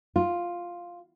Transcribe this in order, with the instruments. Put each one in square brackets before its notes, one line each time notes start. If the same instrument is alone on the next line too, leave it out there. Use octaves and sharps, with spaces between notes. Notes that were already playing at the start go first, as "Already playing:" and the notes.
[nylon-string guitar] F4